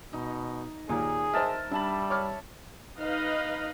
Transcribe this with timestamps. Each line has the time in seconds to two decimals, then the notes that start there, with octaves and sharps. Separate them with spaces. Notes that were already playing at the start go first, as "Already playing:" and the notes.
0.13 B2 D#4
0.89 D#2 A#2 G#4
1.33 A#4 C5 D#5 E5 A5
1.71 G3 D4 E5 A5 B5
2.10 C#5 D6 F6
2.97 D#4 B4 D#5 F5